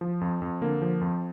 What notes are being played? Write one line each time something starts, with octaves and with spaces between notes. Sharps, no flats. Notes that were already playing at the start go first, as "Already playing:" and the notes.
F3
F2
F2
D3 A#3
F3
F2